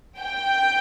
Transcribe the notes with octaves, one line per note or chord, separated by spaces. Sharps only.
G5